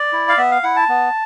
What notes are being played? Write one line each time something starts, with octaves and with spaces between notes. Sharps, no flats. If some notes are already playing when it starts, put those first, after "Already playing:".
Already playing: D5
E4
F5
B3 E5
F5
E4 F#5
A5
B3